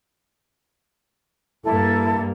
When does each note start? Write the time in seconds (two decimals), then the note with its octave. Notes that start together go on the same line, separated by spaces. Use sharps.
1.63 G2 A#3 E4 A4